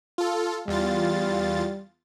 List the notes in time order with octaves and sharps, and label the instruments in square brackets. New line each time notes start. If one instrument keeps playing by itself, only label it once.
[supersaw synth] F4 A4
[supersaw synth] E2 F4 A6 [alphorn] G3